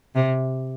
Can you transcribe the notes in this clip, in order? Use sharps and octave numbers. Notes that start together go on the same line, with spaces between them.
C3